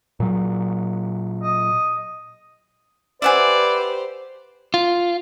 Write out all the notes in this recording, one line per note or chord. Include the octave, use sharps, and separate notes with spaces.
A#2 F#3
D#5
G4 B4 C5 D5 E5 F#5 G#5
F4